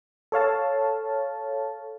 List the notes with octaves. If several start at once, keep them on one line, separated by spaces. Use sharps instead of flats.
A4 C#5 F5 A5